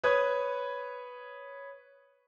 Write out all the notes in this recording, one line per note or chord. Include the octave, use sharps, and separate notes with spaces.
B4 C#5 D#6 G#6